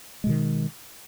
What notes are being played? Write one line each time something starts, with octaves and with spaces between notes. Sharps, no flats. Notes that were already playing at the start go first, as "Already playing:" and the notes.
B2 D#3 G#3